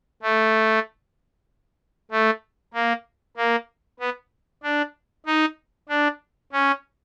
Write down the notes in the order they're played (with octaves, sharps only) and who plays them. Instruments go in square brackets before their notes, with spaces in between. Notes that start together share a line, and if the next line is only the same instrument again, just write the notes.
[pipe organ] A3
A3
A#3
A#3
B3
D4
D#4
D4
C#4